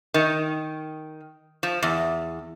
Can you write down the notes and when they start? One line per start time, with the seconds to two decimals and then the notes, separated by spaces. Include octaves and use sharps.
0.14 D#3
1.63 F3
1.83 E2